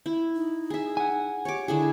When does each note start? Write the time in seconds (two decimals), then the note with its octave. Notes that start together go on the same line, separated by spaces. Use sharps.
0.06 E4
0.35 D#4
0.70 G#4 E5
0.97 F#5 G#5
1.45 G4 C#5 D6
1.68 D3 E4 G#4